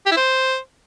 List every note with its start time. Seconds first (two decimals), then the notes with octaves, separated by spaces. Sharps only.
0.06 G4
0.12 E4
0.17 C5